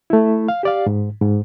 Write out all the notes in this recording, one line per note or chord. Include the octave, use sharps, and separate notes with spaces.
A3 E4
F5
G4 D5 F5
G#2
G#2